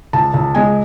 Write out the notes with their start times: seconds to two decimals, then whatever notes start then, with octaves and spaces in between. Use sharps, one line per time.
0.13 C#2 A5
0.34 C#2
0.55 G#3 G#5